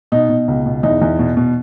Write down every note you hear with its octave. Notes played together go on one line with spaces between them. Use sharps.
B2 D#4
B2
C#2
B2
E2 D#4
E2
B2
B2